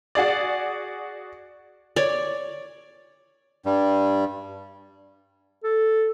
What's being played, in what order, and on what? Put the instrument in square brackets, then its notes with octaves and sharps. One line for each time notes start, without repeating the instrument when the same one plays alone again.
[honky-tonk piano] F#4 G#4 D5
[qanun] C#5 D5
[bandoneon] G2 G3
[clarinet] A4